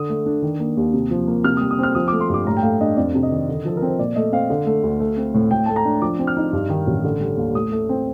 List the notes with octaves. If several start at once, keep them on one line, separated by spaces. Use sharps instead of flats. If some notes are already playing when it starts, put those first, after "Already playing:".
Already playing: D3 D#6
A3
D4
D#3
A#3
D#2
C3
F3
A#3
C3 F6
D#6
G3
D#6
C4 F6
F3 D#6
D6
A3
C6
G2 D6
A2 A#5
G5
A3 F5
D4 D#5
F2 D5
C3
D#5
D#3
D3
F3 A4
A#4
C4
C5
A#2 D5
A3 D#5
C4 F5
D3
A3
D2
A3
C4
A2
A2 G5
A3 A5
A#5
D4
F3 D6
C4
F6
D#4
G2
D#3
A1
D3
G3
D#2
A2 D#6
A3
C4